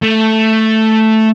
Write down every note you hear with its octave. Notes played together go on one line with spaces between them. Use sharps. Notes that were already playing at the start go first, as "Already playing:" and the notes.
A3